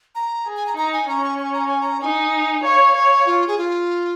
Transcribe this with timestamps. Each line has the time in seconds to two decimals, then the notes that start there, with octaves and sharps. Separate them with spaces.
0.15 A#5
0.46 G#4
0.57 G#5
0.67 A#5
0.77 D#4 A#5
0.93 G#5
1.08 C#4 A#5
1.24 C#6
1.39 C#6
1.53 A#5
1.67 G#5
1.81 A#5
2.01 D#4 G#5
2.64 C#5 F5
2.95 C#5
3.26 F4
3.48 G#4
3.58 F4